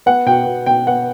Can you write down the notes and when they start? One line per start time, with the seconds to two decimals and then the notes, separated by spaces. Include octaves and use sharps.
0.06 B3 F#5
0.26 B2 G5
0.46 B2
0.66 B2 G5
0.87 B3 F#5